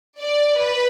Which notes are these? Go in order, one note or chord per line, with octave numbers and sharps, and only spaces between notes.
D5
B4